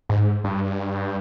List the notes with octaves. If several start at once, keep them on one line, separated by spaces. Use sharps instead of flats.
G#2
G2